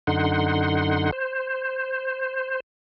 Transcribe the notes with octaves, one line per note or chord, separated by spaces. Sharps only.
F#2 D3 D#4 F#5 C6
C5